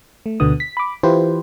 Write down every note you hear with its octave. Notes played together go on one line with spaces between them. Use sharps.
A3
D2 B2 D3 B3 D#6
B6
B5 D6
E3 E4 F4 G4 B4 C5